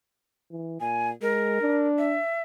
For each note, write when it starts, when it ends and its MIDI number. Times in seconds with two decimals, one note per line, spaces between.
0.51 0.79 52
0.80 1.13 46
0.80 1.09 80
1.22 1.59 56
1.22 1.87 70
1.61 2.19 62
1.98 2.42 76